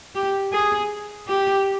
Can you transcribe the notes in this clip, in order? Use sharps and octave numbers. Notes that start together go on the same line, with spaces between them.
G4
G#4
G4